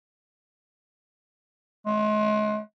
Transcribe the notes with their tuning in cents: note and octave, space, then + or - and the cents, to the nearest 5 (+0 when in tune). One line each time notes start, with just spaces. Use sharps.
G#3 +40